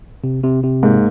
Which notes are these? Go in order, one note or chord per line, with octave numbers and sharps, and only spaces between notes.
C3
C3
C3
G#2 A#3